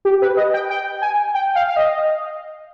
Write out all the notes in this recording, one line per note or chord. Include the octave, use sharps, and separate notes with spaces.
G4
B4
D#5
G5
G5
G#5
G5
F5
F5
D#5